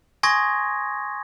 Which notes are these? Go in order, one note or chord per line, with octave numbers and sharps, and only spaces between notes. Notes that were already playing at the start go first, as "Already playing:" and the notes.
G#5 C6 C#6 D#6 G#6 A#6